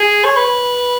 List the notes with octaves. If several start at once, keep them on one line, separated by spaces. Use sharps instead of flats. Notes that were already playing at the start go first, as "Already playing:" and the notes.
Already playing: G#4
C#5
B4